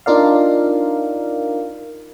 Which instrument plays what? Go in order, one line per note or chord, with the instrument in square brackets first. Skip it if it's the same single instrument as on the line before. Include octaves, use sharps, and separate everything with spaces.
[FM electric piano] D4 D#4 F4 A#4 D5 F5